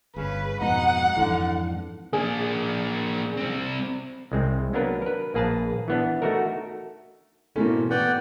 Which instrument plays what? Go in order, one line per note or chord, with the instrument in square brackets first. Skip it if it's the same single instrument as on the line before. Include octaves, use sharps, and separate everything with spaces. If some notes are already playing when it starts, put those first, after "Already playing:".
[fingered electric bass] G1 [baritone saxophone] C#3 [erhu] B4
[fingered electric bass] F2 G#2 B2 [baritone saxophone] D#4 [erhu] F#5
[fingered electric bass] F2 G#2 E3 [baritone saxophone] D3
[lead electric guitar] A#3 D4 [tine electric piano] G#4
[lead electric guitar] G3 C4
[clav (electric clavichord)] C2 G#3 C4
F#3 A#3 B3 D4 A#4 B4
A#4 B4
A#1 A#3 G#4 B4 A5
E3 B3 D4
A3 D#4 F#4 A4 A#4
[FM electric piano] G#2 B2 E3 [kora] A3 [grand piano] A#3 C4 C#4
[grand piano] B3 [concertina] D5 F#5 G5